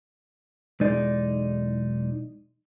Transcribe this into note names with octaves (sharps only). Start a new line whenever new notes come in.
B1 E2 G#3 D#4 D5